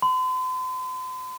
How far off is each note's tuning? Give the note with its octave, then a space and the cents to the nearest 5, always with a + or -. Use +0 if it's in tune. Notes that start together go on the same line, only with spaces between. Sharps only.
C6 -45